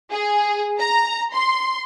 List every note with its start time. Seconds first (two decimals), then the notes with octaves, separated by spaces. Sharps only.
0.11 G#4
0.79 A#5
1.34 C6